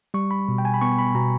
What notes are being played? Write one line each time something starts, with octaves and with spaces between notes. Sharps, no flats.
G3 C#6
B5
B2
G5
G#5
B5
B3 C#6
B5
B2 A#5